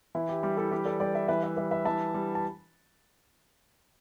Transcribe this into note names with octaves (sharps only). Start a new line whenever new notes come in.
E3 E4
G4
G3 G4
E4 A4
E3 G4 B4
A4 D5
G3 D5 G5
B4 E5
E3 B4 E5
B4 E5
G3 B4 E5
B4 E5
E3 E5 A5
G3
A5